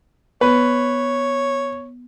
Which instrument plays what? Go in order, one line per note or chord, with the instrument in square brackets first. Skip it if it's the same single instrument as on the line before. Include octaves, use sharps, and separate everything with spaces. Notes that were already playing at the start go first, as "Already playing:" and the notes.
[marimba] B3 [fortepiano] B4 [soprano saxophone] C#5